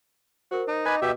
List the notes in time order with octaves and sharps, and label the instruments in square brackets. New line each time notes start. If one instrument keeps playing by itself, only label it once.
[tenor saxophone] F#4 [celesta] A#4 C5
[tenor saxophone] D#4
[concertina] B4 G#5 [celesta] D#5 D6
[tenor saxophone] B2 [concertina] G4 E5